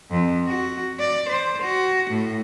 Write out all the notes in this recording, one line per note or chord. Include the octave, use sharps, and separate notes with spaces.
F2
F#4
D5
C5
F#4
A2